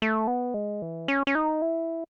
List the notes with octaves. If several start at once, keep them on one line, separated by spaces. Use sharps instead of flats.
A3
B3
G#3
E3
C#4
C#4
D#4
E4